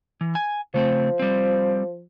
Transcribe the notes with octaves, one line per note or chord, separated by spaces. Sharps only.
E3
G#5
C#3 F3 A3 C4
G3 C4